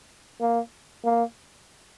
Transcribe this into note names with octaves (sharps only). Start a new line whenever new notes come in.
A#3
A#3